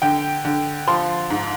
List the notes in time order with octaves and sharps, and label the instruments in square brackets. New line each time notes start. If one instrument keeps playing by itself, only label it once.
[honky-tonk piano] D3 G5
D3
F3 C6
G#2